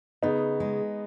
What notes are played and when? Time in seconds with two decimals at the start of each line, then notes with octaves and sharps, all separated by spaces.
0.23 C#3 B3 D#4
0.60 G#3